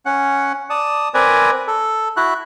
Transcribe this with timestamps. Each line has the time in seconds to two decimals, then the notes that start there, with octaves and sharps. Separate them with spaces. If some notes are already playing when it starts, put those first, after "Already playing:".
0.06 C#4 F#5
0.70 D5 A5 D#6
1.14 C4 A#4 B4 D5 G#5 A#5
1.68 A4
2.17 E4 F#4 F#6